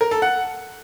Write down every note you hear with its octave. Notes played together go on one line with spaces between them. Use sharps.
A#4
A4
F#5